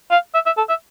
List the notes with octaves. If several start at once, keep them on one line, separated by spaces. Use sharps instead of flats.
F5
E5
E5
A4
E5